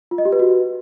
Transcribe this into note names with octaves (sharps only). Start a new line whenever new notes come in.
F4
D#5
G4
B4
F#4